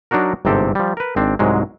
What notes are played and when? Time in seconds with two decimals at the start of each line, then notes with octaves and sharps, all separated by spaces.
0.11 F#3 D4 D#4 F#4 A#4
0.45 G1 G#2 C3 C4 G4 A4
0.75 F3 G3
0.97 A#4 B4
1.16 G#1 C4 D4
1.39 C2 G#2 F#3 G#3